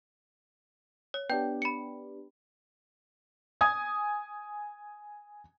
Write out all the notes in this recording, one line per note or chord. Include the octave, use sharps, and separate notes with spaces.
C#5
B3 D4 G4 G5 G6
B5 C#7
G#5 D#6 G#6